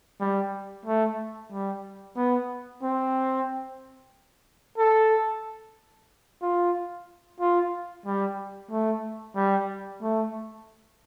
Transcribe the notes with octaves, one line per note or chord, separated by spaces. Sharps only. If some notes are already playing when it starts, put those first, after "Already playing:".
G3
A3
G3
B3
C4
A4
F4
F4
G3
A3
G3
A3